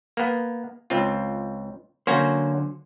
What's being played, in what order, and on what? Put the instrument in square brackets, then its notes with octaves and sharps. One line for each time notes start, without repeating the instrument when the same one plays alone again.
[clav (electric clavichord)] A#3 B3
C#2 C4 F4
[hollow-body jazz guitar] D3 F#3 C5 [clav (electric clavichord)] A#3 C#4 F#4